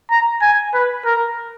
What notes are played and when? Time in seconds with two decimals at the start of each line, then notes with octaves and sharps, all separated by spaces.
0.10 A#5
0.42 G#5
0.74 B4
1.05 A#4